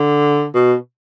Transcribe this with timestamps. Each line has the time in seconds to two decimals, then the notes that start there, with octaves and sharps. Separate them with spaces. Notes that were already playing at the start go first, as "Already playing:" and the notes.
Already playing: D3
0.54 B2